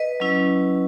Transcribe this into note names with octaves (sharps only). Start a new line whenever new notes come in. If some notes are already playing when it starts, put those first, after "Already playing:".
Already playing: B4 D#5
F#3 C#4 E4